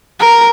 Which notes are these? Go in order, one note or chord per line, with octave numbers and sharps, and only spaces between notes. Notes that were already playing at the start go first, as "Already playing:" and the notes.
A#4